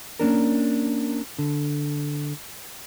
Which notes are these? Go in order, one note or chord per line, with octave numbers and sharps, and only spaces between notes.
A#3 C#4 D4 A#4
D3